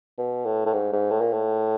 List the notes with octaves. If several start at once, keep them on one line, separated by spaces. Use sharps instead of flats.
B2
A2
A2
G#2
G#2
A2
A#2
A2